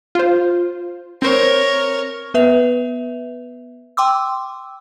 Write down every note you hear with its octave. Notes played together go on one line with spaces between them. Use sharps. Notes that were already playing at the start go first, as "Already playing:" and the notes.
F4 C5
C4 A#4 C5 C#5
B3 B4 E5 F7
G5 C6 D6 E6